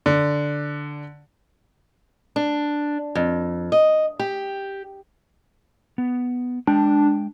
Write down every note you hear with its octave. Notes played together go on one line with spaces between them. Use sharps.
D3
D4
F2
D#5
G4
B3
G#3 D4 G5